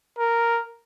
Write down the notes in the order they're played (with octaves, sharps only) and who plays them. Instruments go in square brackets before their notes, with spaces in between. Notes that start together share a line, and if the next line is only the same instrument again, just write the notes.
[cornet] A#4